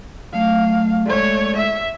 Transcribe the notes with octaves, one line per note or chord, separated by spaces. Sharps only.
F#3 A3 F5
G#3 A3 C#5 D5
E5